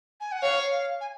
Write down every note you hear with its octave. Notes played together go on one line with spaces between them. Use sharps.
G#5
F#5
C#5 F5
G#5